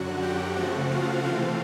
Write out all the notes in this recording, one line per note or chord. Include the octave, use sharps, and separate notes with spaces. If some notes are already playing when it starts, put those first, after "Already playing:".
Already playing: F#2 D3 F#3 F#4 F#5
G4 G5
C#3 F3 A3 C4 F#4 F#5
F4 F5
C3 E3 A3 C4 F4 F5